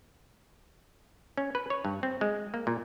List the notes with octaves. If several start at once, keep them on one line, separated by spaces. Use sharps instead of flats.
C#4
B4
C#5
G2
C4
G#3
A#3
A#2